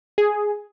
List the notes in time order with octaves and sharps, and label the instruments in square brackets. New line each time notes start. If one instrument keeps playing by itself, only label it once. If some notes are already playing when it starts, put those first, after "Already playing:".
[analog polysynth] G#4